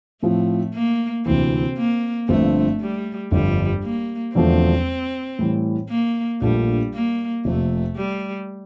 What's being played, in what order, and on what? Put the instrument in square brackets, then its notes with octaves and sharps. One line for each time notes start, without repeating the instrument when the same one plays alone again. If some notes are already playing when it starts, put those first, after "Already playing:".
[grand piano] A2 F3 C4 [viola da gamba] A3
[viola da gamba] A#3
[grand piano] D2 C3 E3 [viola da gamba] C4
[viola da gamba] A#3
[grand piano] G1 G2 D3 F3 C4 [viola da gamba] A3
[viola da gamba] G3
[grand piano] G1 F2 D3 [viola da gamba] G3
[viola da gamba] A#3
[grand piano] E1 E2 D3 F3 A3 [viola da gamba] C4
[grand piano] A2 E3 G3
[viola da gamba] A#3
[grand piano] A#1 A#2 A3 D4 [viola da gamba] G3
[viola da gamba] A#3
[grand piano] F1 F2 C3 [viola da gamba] A3
[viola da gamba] G3